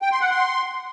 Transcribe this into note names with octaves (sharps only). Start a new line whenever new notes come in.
G5
C6
F#5
C6